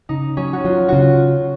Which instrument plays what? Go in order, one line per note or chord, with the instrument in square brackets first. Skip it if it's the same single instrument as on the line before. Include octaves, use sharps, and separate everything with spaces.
[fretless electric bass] C#3 [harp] D#4
[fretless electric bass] F#3 [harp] C#4
[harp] F#4
[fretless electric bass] F#3 [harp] F4
[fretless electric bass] C#3 [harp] F4 F#4